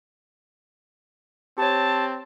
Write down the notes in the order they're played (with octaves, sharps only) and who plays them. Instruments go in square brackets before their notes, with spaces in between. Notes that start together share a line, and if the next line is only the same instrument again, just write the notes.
[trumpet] C4 [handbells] G4 C#5 [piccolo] A5